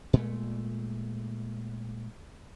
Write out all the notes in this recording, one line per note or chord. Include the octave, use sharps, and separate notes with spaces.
A#2 G#3 A3